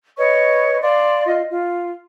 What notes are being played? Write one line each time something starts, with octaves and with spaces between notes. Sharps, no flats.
B4 C#5 D#5 C#6
D5 F5 C6
F4 D#5
F4